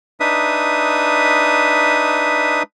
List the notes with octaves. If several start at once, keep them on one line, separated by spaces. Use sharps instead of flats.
D4 D#4 B4 E5 D#6